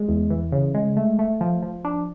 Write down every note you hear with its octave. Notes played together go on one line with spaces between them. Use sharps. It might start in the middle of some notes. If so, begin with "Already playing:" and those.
Already playing: G#3
E2
E3
C#3
G#3
A3
A3
F3
F3
D4